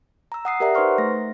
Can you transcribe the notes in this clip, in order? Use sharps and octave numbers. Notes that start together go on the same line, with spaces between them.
A#5 E6
F#5 D#6 C7
G4 A#4 D5 E5 F#5 A#5
D#4 B4 C5 C6 C#6 F6
A3 A#6